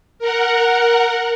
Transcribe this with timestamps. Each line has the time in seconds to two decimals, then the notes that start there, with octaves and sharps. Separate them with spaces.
0.19 A#4 F#5